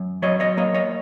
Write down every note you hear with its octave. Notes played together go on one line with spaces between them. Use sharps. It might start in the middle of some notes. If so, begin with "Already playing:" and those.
Already playing: F#2
F#3 C#5 D#5
C#5 D#5
A#3 C#5 D#5
C#5 D#5